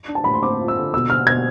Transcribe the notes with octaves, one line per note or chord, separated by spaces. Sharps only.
D4
A5
A2 B5
C6
C4 D6
F4
E6
D3
B2 E6
B2 F6
B2 G#6